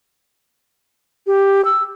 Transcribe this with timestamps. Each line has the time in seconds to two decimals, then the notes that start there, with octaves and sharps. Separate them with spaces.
1.27 G4
1.65 E6